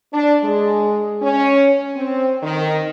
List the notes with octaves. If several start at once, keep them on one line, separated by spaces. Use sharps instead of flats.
D4
G#3
C#4
C4
D#3